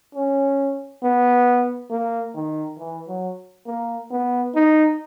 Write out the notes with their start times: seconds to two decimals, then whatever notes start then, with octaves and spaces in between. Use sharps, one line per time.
0.15 C#4
1.02 B3
1.90 A#3
2.35 D#3
2.78 E3
3.08 F#3
3.66 A#3
4.11 B3
4.55 D#4